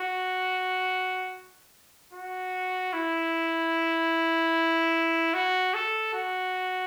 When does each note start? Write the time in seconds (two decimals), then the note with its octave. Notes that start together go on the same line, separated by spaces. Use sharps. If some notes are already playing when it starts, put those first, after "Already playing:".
Already playing: F#4
2.13 F#4
2.93 E4
5.34 F#4
5.74 A4
6.14 F#4